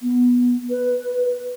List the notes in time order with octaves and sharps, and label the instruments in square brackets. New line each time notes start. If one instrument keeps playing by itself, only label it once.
[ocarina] B3
B4